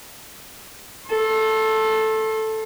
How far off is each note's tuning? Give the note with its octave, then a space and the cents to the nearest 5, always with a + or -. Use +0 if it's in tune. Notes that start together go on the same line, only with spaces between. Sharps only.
A4 +0 C6 +40